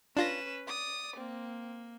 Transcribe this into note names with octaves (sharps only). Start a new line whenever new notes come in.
C#4 D4 F4 B4 A#6 E7
D5 D#6
A#3 C4